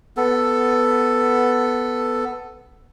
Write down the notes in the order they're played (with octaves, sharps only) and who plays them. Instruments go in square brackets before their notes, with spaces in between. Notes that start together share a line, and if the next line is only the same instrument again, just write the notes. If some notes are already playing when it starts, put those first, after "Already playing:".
[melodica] B3 A4